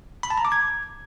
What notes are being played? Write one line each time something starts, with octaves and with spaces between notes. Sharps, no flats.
B5
A5
A#5
D6
G#6